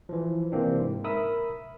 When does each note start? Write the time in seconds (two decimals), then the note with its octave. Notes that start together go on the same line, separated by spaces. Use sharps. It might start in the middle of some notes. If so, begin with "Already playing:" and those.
0.09 E3 F3
0.52 C3 E3 A#3 C4 D4
0.80 G#2
1.04 A#4 E5 B5 D#6 E6